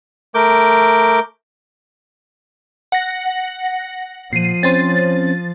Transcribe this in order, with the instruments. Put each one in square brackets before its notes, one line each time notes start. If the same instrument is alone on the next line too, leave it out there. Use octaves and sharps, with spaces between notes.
[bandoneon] A3 A#4 D6 G6
[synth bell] F#5 A#6
[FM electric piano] A#2 [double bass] F3 [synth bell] C7 D#7
[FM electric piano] C4 C#4 C5 [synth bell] A6